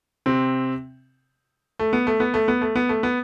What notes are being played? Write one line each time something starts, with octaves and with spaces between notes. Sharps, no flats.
C3 C4
A3
B3
A3
B3
A3
B3
A3
B3
A3
B3